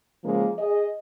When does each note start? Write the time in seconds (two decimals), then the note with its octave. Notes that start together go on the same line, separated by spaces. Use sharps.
0.24 C#3 F3 G#3 A#3
0.58 G#4 D#5